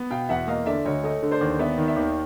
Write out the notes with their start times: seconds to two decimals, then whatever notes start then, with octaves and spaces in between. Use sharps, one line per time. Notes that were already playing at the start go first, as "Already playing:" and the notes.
Already playing: B3
0.11 B2 F5 G5
0.29 E2 E5 F#5
0.47 A#3 D#5 F5
0.66 D3 D5 E5
0.85 D2 C#5 D#5
1.03 A3 C#5 D#5
1.23 D3
1.31 C5 D5
1.41 D#2
1.59 B3 D5 E5
1.78 D#3
1.88 D5 E5
1.96 D#2